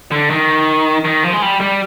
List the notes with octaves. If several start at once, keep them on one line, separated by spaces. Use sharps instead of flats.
D3
D#3
D#3
F3
G#3
G3
G3